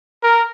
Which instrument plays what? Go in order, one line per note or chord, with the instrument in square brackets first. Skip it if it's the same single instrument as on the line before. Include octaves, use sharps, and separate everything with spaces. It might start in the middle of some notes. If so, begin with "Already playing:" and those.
[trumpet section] A#4